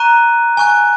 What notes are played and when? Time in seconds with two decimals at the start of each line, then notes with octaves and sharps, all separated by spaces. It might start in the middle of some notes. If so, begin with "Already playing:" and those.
Already playing: A#5 C#6 F#6 D#7
0.57 G#5 C#6 F#6